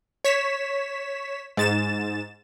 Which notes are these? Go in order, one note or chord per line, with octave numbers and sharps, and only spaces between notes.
C#5 B6 E7
G#2 A6 E7